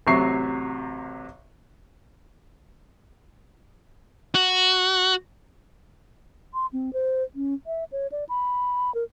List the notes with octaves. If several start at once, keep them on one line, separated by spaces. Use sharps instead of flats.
A1 C3 F#3 E5 C#6 C7
F#4
C6
C4
C5
C#4
E5
C#5
D5
B5
A#4